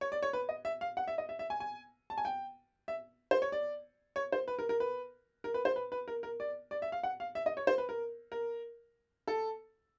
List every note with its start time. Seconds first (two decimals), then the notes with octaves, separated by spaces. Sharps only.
0.01 C#5
0.12 D5
0.23 C#5
0.33 B4
0.49 D#5
0.65 E5
0.81 F5
0.97 F#5
1.08 E5
1.18 D#5
1.29 E5
1.39 E5
1.50 G#5
1.60 G#5
2.10 A5
2.18 G#5
2.25 G5
2.88 E5
3.31 C5
3.42 C#5
3.52 D5
4.16 C#5
4.32 C5
4.48 B4
4.59 A#4
4.69 A#4
4.80 B4
5.44 A#4
5.54 B4
5.65 C5
5.76 B4
5.92 B4
6.08 A#4
6.23 A#4
6.40 D5
6.71 D5
6.82 E5
6.92 F5
7.03 F#5
7.20 F5
7.35 E5
7.46 D#5
7.57 C#5
7.67 C5
7.78 B4
7.89 A#4
8.32 A#4
9.28 A4